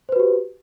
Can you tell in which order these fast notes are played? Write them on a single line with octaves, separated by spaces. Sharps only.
C5 B4 F#4 G4